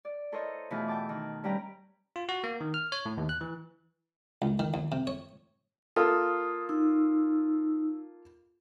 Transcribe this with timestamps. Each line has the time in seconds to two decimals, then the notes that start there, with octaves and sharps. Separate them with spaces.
0.05 D5
0.32 E4 A4 A#4 C5 C#5 D#5
0.70 B2 E3 A3 E4 F4 G#4
0.88 E5 G5 A5 D6
1.09 D#3
1.44 G2 G3 C#4 B4 G5 A#5
2.16 F4
2.29 F#4
2.44 A#3
2.61 D#3
2.74 F6
2.92 C#5
3.06 A2
3.17 D#2
3.29 F#6
3.41 E3
4.42 C#2
4.59 D#3
4.74 D#2
4.92 C3
5.07 C#5
5.96 A#3 F4 A4 D#6
6.69 D#4 E6